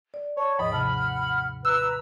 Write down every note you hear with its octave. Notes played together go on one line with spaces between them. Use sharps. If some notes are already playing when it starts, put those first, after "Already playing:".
D5
C#5 A5 C#6
D#2 G#2 F3 D#5 B5 D#6
C3 F3 F#5 A5 F6
B4 A#5 E6 F#6